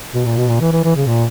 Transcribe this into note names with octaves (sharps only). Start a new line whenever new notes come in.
B2
A#2
B2
A#2
E3
E3
E3
C#3
A#2